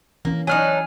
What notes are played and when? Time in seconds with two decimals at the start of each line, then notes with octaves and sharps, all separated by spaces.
0.25 E3 A#3 C#4
0.47 F#3 D4 D#4 G#5 F6